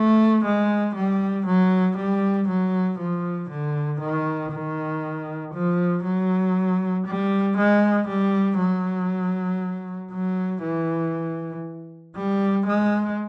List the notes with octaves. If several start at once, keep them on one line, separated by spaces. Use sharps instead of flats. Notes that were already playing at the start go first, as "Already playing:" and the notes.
Already playing: A3
G#3
G3
F#3
G3
F#3
F3
D3
D#3
D#3
F3
F#3
G3
G#3
G3
F#3
F#3
E3
G3
G#3